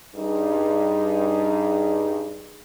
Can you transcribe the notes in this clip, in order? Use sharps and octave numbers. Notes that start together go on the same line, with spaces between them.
G2 D#4 G#4